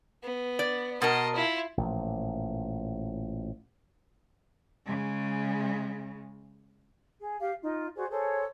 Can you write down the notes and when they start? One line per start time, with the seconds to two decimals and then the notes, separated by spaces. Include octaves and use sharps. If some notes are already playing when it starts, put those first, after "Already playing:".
0.23 B3
0.59 D5
1.02 B2 A#4 D#5 A5 C6
1.35 E4 F4
1.77 A1 A#2 F3
4.85 C#3 G#3
7.20 G#4
7.39 G4 F5
7.61 D#4 F4
7.95 F#4 G#4 C5 D5
8.09 G#4 A4 C5 C#5